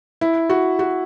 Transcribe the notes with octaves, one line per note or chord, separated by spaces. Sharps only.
E4
F#4
F#4